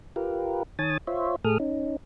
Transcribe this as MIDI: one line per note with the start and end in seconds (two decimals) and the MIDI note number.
0.16 0.63 65
0.16 0.63 67
0.16 0.63 70
0.16 0.63 71
0.79 0.97 51
0.79 0.97 73
0.79 0.97 80
0.79 0.97 81
0.79 0.97 87
0.79 0.97 93
1.07 1.36 65
1.07 1.36 72
1.07 1.36 73
1.07 1.36 76
1.44 1.58 45
1.44 1.58 57
1.44 1.58 68
1.44 1.58 69
1.44 1.58 87
1.44 1.58 89
1.60 1.96 61
1.60 1.96 63